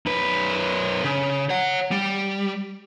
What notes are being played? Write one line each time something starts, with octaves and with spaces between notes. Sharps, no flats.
F#2 B4
C#3
C#5 F#5
G3